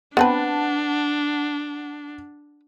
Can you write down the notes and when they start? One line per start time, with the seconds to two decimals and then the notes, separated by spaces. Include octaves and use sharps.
0.17 B3 C4 D4 B4 F#5 A5